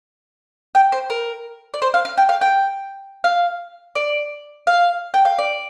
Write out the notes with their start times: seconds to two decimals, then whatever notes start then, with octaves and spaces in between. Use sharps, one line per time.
0.75 G5
0.92 C5
1.10 A#4
1.74 D5
1.82 C5
1.94 F5
2.05 F5
2.18 G5
2.29 F5
2.41 G5
3.24 F5
3.95 D5
4.67 F5
5.14 G5
5.25 F5
5.38 D5